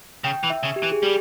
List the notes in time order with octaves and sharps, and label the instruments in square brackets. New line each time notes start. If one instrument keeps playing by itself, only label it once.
[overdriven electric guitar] C#3 [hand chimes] G5
[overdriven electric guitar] E3
[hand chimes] E5
[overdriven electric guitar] C#3
[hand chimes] G4
[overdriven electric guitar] E3
[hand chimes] G#4
[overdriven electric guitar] G3 [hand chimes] G4